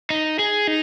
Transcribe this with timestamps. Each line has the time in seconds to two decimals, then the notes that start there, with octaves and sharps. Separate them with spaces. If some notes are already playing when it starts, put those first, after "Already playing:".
0.10 D#4
0.39 G#4
0.67 D#4